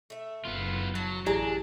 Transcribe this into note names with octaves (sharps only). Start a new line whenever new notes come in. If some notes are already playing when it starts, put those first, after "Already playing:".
A3 E5
F#1 B3 F4
F#3 A5
A1 D4 E4 G4 G#4 D5 A#5